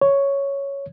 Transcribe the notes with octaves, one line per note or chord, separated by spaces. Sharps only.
C#5